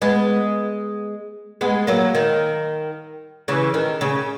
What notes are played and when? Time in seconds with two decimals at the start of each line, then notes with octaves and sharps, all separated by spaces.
0.02 G#3 B3
1.61 G#3 B3
1.87 F#3 A#3
2.15 D#3
3.48 C#3 E3
3.74 D#3
4.01 C#3